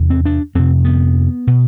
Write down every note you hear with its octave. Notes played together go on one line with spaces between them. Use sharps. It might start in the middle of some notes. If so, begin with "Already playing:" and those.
Already playing: E2 C3
C4
D4
F2 C3 C4
B3
B2